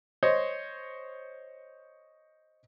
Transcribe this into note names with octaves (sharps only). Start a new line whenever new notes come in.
C5 C#5 D#5